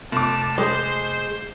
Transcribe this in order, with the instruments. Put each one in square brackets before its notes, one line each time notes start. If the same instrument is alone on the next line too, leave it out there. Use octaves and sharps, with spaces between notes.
[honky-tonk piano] F1 D6 [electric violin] A5
[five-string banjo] G#3 [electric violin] C5